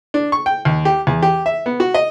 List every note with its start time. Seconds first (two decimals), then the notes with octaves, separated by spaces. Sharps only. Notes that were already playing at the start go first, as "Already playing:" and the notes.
0.14 D4
0.32 C#6
0.46 G5
0.65 D#2
0.85 G4
1.07 E2
1.23 G4
1.46 E5
1.66 B3
1.80 F#4
1.94 D#5